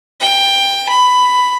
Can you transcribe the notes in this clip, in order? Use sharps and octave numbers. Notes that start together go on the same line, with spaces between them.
G5
B5